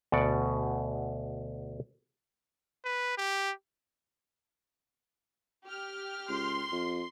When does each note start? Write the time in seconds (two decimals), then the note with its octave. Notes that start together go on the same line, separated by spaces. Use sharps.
0.12 D2 B2 D5 F#5
2.85 B4
3.18 G4
5.66 G4 F6
6.29 C#2 C6
6.72 F2